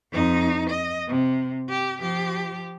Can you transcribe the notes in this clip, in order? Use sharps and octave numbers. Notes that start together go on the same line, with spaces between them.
F2 D#4
D#5
C3
G4
F3 G4